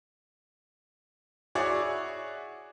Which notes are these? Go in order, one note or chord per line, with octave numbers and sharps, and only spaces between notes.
E4 F#4 G#4 C#5 D5